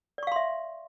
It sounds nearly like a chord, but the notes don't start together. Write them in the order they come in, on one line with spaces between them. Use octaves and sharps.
D5 C#6 F5 C6 E5